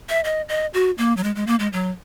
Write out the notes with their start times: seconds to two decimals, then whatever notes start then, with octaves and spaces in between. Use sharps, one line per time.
0.09 E5
0.24 D#5
0.49 D#5
0.74 F#4
0.98 A#3
1.17 F#3
1.24 G#3
1.36 G#3
1.47 A#3
1.59 G#3
1.73 F#3